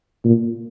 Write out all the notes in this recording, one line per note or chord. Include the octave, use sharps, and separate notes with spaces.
A#2